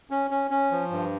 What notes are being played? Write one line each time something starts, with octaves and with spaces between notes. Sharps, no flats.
C#4
C#4
C#4
F3
G2